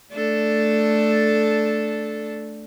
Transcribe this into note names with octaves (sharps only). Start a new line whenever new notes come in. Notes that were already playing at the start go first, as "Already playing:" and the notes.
A3 D4 A4